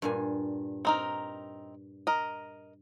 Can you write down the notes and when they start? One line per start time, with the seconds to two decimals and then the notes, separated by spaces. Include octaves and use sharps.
0.02 G2 A#2 G#5
0.85 C4 D#4 A#4
2.07 A#4 D#5